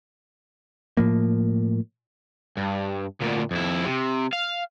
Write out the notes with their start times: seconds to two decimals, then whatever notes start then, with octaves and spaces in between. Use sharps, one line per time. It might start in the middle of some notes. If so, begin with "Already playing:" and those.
0.97 A2 F3 A#3
2.57 G2
3.21 D2 A#2
3.51 F2 E4
3.85 C3
4.33 F5